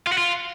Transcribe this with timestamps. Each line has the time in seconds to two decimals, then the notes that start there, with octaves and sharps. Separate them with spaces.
0.07 F4
0.12 F#4
0.18 F4